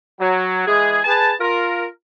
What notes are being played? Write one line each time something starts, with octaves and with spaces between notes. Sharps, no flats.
F#3
E3 G#3 G#4
G#4 B4 A5
F4 A#4